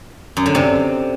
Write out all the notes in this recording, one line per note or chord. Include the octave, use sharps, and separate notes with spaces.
F#2
D3
C3